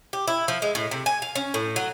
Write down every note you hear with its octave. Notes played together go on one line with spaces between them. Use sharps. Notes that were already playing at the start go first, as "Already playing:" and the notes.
G4
E4
F3
G#3
A2
C3
G#5
F5
C#4
A2
F#3